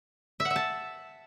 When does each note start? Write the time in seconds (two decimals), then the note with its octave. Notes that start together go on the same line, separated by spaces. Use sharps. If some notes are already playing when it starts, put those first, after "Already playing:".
0.40 E5
0.45 F#5
0.50 E5
0.56 A5